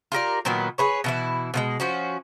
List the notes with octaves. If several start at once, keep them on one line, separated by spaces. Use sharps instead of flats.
F4 G4 A#4 D5
A#2 D#3 F#3 B3
G#4 B4 C#5
B2 E3 E4
B2 D#3 G#3
F3 C#4 F#4